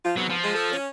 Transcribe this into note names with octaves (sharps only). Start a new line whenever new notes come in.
F3 F4
G#2 C3 F#3 B3
F3
G#3
A4
C#4